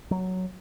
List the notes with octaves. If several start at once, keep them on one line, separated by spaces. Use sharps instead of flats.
F#3